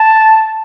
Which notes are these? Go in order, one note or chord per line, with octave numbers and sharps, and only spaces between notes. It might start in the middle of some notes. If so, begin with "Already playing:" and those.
Already playing: A5